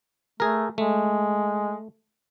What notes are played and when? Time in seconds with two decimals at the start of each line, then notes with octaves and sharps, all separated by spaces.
0.40 A3 G#4 A#4
0.78 G#3 A3